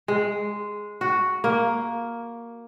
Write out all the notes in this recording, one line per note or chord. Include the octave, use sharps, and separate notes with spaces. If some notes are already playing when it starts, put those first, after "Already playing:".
G#3
F#4
A#3